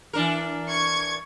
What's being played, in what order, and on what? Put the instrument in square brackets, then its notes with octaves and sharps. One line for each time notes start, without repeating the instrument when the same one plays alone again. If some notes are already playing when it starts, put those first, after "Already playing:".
[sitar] E3 D4 A#4
[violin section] C#6 G#6